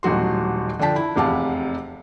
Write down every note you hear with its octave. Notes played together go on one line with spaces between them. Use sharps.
D#1 A1 F#3 F#4 C6
D3 F3 D4 G5 A5 B6
E4
F1 E2 C3 F5 F#5 A5